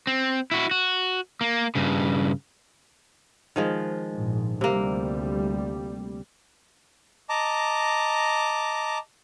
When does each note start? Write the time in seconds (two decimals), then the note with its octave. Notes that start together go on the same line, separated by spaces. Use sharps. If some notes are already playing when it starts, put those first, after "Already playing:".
0.07 C4
0.51 E4 F#4
0.71 F#4
1.41 A#3
1.75 G2 C#3
3.56 D#3 F3 G#3
4.12 A#1 G#2
4.61 D2 C3 G3 A#3
7.29 D#5 A5 A#5 D6